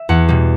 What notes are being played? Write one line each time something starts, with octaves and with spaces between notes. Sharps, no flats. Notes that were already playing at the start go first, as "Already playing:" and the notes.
Already playing: E5
E2 F#5
B2 G3